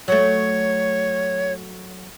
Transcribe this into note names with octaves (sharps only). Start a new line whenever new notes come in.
F#3 A3 C#5